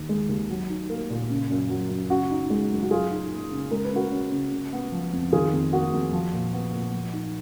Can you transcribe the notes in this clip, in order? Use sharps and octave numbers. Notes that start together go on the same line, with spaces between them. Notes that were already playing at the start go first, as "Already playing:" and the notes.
Already playing: D#2 D#3
G#3
D#2
F#3
D#4
A#3
A#2
C#3
F#2
F#3
F#2
C#3 F#4
D#4
G#3
F#2
F#4
F#3 F4 G#4
D#4
A#3
C#3
G#3 A#4
B4
C#3 F#4 A#4
C#4
C#3
C#3
B3
F3
F2
D#3 F4 G#4
F2
A#3 F#4
F2
F3
A#2
B3
A#2
F3
D#4